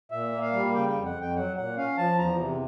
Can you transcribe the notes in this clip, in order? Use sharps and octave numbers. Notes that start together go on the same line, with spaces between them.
A#2 E5
A#3
F5
G3
C#3 G5
G5
F2
F#5
F2
G5
F#3 F#5
A#2 F#5
C#4 F5
F3 A5
E2 A#5
C3